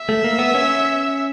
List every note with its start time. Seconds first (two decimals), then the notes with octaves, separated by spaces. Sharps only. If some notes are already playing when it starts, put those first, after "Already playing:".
Already playing: E5
0.09 A3
0.24 A#3
0.39 B3
0.55 C#4